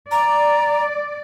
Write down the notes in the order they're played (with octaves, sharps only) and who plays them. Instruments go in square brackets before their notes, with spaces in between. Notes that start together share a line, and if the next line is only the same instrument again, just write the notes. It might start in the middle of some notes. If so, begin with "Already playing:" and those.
[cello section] D5 [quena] A#5